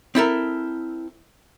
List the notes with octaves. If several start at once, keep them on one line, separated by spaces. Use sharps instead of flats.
C4 E4 A4 A#4